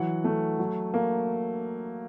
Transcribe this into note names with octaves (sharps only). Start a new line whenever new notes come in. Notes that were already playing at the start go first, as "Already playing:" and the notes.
Already playing: E3 F#3 F#5
A3
F#3
A#3